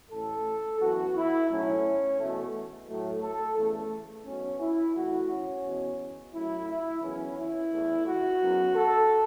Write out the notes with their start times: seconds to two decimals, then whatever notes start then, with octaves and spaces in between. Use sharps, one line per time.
0.11 A1 A2 A3 A4
0.80 F#2 E3 B3 F#4
1.15 E4
1.49 B1 A2 F#3 A3 C#4
2.18 E2 B2 A3
2.87 A2 F#3 A3
3.21 A4
3.56 E2 C#3 A3
4.26 B1 B2 B3 C#4
4.59 E4
4.94 E2 E3 A3 F#4
5.29 C#4
5.64 E2 B2 B3
6.32 F#2 F#3 A3 E4
6.67 E4
7.01 F#2 C#3 E3 B3 C#4
7.36 E4
7.70 E2 E3 A3
8.05 F#4
8.40 F#2 C#3 F#3 B3
8.74 A4